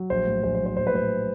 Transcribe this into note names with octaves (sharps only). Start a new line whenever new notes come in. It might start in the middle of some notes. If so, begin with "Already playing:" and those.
Already playing: F#3
A#1 C5
A2
A#1 C5
C5
F#3
C5
A#1 C5
B4
A2 C5